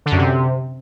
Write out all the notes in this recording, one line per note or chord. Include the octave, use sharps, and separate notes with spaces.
D3
F#2
C3